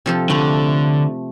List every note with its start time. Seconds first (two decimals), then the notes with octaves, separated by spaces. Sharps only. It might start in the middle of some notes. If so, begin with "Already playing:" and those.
0.06 C3 F3 A4
0.30 D3 A3